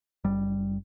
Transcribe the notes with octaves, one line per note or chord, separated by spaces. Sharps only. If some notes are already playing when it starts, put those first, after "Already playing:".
F#1 G3